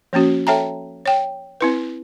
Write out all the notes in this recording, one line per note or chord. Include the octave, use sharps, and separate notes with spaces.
F3 A#3 C#4 F#4
A4 C#5 E5 G5 A5 A#5
C#5 G5
C4 E4 B4